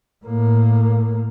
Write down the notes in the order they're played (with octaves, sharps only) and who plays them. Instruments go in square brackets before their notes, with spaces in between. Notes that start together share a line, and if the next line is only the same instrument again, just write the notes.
[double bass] A2 A#3